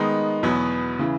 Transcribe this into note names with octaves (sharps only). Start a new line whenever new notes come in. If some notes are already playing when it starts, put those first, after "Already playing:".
Already playing: D#3 G#3 B3 D#4
E2 B2 F#3 B3
C#3 E3